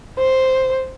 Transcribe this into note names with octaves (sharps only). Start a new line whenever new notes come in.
C5